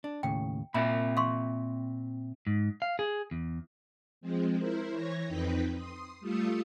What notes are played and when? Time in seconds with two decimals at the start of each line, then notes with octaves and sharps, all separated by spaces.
0.04 D4
0.23 D#2 A2 C#3 G5
0.74 A#2 C4 E5 B5
1.17 F5 C6 C#6
2.47 G#2
2.82 F5
2.99 G#4
3.31 E2
4.21 F3 G#3 C4
4.58 E4 A#4 C5
4.89 E3 C#5 G#6 A#6
5.25 F2 C4 D#4 B4 G5 B6
5.73 C6 D#6
6.20 G3 A3 F4 D#6 E6 C#7